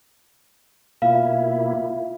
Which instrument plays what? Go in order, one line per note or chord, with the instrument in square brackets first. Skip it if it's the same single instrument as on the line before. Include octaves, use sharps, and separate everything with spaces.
[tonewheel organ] B2 A#3 E4 [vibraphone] F4 E5 [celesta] F5